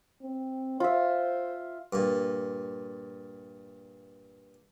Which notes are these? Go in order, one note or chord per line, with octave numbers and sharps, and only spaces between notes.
C4
F4 C5 E5
G2 A#2